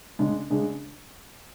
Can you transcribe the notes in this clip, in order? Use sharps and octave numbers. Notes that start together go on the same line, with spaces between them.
C#3 G#3 D4 G#4
C#3 G#3 D4 G#4